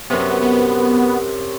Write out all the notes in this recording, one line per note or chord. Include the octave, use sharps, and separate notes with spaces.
F#2 C3 B3
B3